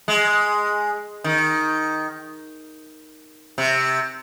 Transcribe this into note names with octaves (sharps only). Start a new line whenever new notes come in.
G#3
D#3
C3